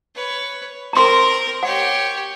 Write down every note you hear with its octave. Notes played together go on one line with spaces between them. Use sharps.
B4 C#5
C4 A#4 A#5 C6
G4 C#5 F#5